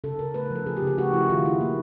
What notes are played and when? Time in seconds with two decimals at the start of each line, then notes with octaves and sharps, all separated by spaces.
0.04 C#3 A4
0.19 C#3 A#4
0.34 A3 B4
0.45 A#4
0.51 F3
0.56 A4
0.66 C#3 G#4
0.77 G4
0.82 C#3 G#4
0.98 A3 F#4
1.13 F3 E4
1.30 D#3 F4
1.45 D#3 E4
1.61 A#3